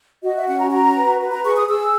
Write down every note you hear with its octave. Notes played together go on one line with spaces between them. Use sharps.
F#4 D#5
E5
C#4 F#5
A#5
F#4 A#5
B4
B4
A#5
G#4 C#6
D#6
G#4 E6